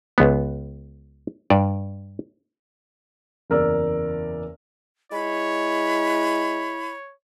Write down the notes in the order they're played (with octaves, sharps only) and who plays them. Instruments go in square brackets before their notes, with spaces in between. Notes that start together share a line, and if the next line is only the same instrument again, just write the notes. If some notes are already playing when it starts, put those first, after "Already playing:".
[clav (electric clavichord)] C#2 B3
G2 D5
[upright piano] F#1 E2 A#4 D5 E6
[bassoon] G#3 [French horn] E4 [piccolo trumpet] C#5 [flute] B5